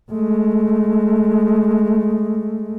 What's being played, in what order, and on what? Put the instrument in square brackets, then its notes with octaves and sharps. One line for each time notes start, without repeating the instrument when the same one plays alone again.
[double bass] G#3 A3